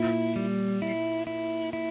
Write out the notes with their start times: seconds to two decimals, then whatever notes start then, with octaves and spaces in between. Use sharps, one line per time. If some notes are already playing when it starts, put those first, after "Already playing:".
Already playing: A#2 E4
0.36 G3
0.82 E4
1.27 E4
1.73 E4